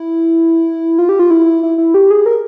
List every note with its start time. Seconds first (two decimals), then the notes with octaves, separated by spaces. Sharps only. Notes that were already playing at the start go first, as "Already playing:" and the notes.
Already playing: E4
0.99 F4
1.09 G4
1.19 F4
1.31 E4
1.63 E4
1.78 E4
1.94 G4
2.10 G#4
2.26 A#4